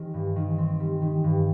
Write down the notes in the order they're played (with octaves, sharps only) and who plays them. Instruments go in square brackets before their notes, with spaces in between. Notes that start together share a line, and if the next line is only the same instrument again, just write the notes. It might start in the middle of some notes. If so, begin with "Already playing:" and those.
Already playing: [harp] D#3 G3 C4
G2
D#3
C4
G3
D#3
G2